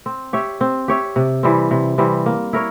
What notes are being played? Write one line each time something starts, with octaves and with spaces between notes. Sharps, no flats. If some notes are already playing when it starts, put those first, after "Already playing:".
C4
G4 C#5 E5
C4
G4 C#5 E5
C3
E3 G3 C4
C3
E3 G3 C4
A#3
E4 A#4 C#5